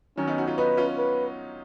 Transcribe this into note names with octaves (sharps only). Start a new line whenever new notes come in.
D#3 F#3 C#4
B3 D#4
D#4 F#4
C#4 F4
B3 D#4 B4
C#4 F4
B4